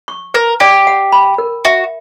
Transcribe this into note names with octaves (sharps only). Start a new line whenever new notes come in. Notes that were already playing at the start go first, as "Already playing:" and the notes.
C#6
A#4 B4
G4 D5
F#5
B5
A#4
F#4 E5